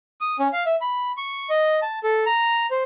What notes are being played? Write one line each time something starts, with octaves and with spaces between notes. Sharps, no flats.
D#6
C#4
F5
E5
B5
C#6
D#5
A5
A4
A#5
C5